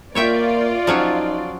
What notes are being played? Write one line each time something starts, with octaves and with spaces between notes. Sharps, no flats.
A#3 F4 C#5 D5 E5 G5
F3 F#3 C#4 D#4